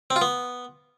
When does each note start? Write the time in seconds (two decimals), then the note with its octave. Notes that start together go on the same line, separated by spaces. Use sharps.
0.10 C4
0.16 F4
0.22 B3